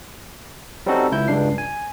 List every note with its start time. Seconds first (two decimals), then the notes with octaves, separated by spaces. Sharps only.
0.86 G3 C4 C#4 D#4 F#4 A4
1.12 C#2 E4 G6
1.28 C#2 G2 D4 C7
1.58 G#5